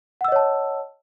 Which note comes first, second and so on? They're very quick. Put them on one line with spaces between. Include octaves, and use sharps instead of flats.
F#5 E6 D#5 C#5 A5